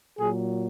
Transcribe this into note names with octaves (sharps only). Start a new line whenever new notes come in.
A#2 F#3 G#4